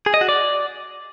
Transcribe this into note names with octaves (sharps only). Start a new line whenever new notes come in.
G#4
D#5
F#4
D5